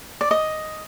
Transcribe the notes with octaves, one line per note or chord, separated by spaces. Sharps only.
D5
D#5